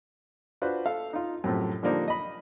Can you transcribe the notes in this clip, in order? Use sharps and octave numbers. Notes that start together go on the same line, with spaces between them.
D4 F4 F#4 B4 C5
A4 F5
D#4 F4
F#2 A2 C3 F3 A3
D3 F3 G3 A#3 D4 D#4
D#5 B5